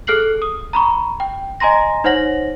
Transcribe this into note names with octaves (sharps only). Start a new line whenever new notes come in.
G#4 A4 F6 F#6 C7 F#7
D#6
A#5 B5 C#6
G5
D#5 G#5 A#5 C6 A#6
D#4 C5 C#5 F#5 A#6 F#7